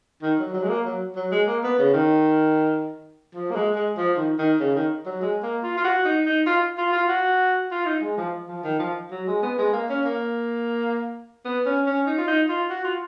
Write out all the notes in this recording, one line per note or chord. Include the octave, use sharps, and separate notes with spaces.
D#3
F#3
F#3
G#3
A#3
F#3
F#3
G#3
A#3
B3
C#3
D#3
F3
A#3
G#3
G#3
F3
D#3
D#3
C#3
D#3
F#3
G#3
A#3
F4
F4
F#4
D#4
D#4
F4
F4
F4
F#4
F4
D#4
G#3
F3
F3
D#3
F3
F#3
G#3
B3
G#3
A#3
C#4
A#3
B3
C#4
C#4
D#4
F4
D#4
F4
F#4
F4